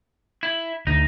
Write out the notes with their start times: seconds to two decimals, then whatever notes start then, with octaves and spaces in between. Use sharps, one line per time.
0.43 E4
0.87 D2 D#4